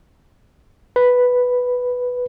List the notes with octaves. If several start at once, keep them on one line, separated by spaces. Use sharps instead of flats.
B4